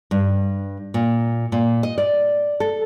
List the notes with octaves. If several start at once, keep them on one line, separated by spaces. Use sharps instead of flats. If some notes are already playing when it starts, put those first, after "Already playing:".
G2
A#2
A#2
D#5
D5
A4